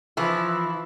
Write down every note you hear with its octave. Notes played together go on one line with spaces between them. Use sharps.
E3 F3 E4